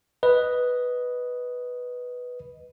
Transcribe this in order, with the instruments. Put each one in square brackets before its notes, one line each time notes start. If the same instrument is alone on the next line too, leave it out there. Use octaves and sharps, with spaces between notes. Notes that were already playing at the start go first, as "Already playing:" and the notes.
[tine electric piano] B4 D#5